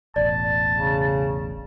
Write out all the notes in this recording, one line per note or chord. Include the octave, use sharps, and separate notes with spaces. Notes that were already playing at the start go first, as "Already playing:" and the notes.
E1 A1 D5 A5
C#3